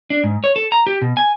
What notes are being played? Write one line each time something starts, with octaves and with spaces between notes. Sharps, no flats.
D4
G#2
C#5
A4
A#5
G4
B2
G#5